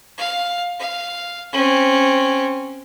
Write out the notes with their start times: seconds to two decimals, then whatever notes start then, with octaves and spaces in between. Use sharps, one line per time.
0.18 F5
0.79 F5
1.53 C4 C#4